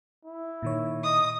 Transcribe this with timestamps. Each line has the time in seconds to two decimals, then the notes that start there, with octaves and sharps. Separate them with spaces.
0.25 E4
0.63 A#2 D#3 C#5
1.04 D#5 D#6